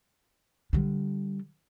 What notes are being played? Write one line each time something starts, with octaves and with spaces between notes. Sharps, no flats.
D3 G3